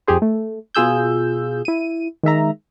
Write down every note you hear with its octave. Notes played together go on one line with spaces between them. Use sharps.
F2 G4 G#4 C5
A3
B2 F4 G#4 E6 G6
E4 D#7
D#3 G#3 E5 A#5